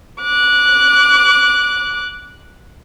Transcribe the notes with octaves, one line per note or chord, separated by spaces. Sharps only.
D6 F#6